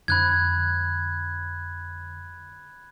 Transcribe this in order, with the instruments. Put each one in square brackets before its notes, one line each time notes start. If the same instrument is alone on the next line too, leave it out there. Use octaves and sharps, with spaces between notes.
[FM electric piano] F2 D3 [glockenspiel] B5 F#6 G#6